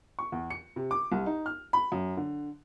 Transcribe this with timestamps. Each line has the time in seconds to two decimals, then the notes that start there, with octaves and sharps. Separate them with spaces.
0.19 C#6
0.32 E2
0.50 C#7
0.76 C3
0.91 D6
1.12 C2
1.26 D#4
1.46 F6
1.73 B5
1.92 F#2
2.17 D3